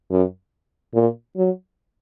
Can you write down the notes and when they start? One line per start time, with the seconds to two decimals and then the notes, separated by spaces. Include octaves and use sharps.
0.10 F#2
0.94 A#2
1.37 F#3